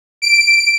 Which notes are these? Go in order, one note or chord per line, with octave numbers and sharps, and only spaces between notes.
D7